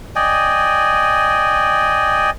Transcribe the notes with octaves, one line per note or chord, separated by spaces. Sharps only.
D5 D#5 G5 G#5